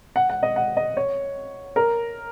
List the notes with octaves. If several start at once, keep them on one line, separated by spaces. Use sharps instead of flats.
F#5
F#5
D#5
F#5
D#5
C#5
A#4